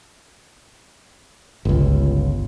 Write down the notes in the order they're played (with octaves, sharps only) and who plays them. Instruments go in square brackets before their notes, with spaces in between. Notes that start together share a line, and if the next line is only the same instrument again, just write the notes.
[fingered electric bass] G1 C#2